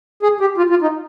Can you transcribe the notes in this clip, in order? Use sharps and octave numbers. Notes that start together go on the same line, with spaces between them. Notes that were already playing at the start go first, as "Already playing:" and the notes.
G#4
G4
F4
F4
D#4